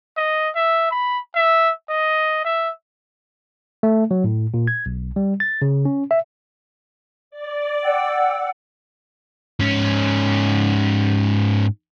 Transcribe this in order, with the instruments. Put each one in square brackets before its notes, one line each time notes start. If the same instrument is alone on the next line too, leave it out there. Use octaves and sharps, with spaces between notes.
[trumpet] D#5
E5
B5
E5
D#5
E5
[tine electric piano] A3
F#3
A2
A#2
G#6
B1
G3
A6
C#3
C#4
E5
[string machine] D5
[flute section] F#5 G5 E6
[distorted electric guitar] G#2 C#4